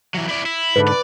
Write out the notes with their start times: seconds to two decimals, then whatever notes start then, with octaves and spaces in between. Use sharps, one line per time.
0.14 E3 F#3
0.29 E4 D5
0.46 E4
0.76 G#2 D3 D4 B4
0.88 D5